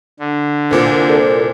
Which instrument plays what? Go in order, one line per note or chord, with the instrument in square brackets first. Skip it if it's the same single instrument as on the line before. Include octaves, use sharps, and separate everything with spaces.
[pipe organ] D3
[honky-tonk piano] C2 A#2 [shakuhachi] C5
[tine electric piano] A4 A#4 D5